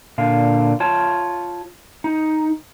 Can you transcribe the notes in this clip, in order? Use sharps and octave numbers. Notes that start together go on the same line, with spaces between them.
A#2 D3 F5
F4 C#5 A5
D#4